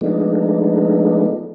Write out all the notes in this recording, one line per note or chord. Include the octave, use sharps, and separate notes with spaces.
F3 G#3 A3 B3 D4 D#4